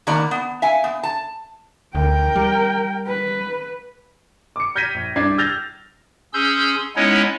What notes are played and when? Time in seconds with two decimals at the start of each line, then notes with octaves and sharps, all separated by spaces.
0.07 D#3 A#3 B3 D5 A5
0.31 B3
0.62 E5 F5 G#5
0.84 B3
1.03 A5
1.95 D2 A#4 G5
2.36 G3
3.07 B4
4.56 D6 C#7
4.75 F6 G6 G#6 A#6 B6 D#7
4.94 A#1
5.16 C2 G2 D4 G#6 C7
5.38 E6 F6 G6 A6 A#6 F7
6.33 C#4 G#4 C6 E6 G6
6.96 G#3 B3 C#4 D#4 E4 C#5